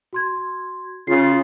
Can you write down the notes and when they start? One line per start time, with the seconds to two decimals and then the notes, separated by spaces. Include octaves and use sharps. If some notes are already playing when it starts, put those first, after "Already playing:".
0.13 F#4 C6 G#6
1.07 C#3 F4 C7